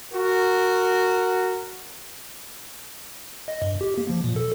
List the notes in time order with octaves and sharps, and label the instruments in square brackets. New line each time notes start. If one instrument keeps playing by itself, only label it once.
[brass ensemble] F#4 A#4
[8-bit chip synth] D#5
G2
G4
A#3
F3
A#2
A4